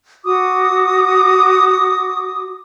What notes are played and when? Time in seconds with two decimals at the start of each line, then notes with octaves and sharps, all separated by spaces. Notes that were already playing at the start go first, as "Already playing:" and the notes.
0.24 F#4 D6 D#6